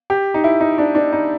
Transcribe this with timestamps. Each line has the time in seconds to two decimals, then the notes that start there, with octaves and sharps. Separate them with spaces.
0.10 G4
0.34 D#4
0.44 E4
0.61 D#4
0.78 D4
0.95 D4
1.12 D#4